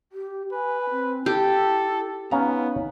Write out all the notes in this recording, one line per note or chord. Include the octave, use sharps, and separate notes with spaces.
G4
B4 G#5
C4
E4 G4 A4
B3 C#4 D#4 F5 A#5